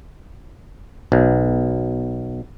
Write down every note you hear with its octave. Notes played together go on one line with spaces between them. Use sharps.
B1